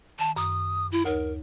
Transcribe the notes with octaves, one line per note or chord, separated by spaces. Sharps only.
D#3 A5
F#2 D#6
E4
D2 D#4 A#4 C#5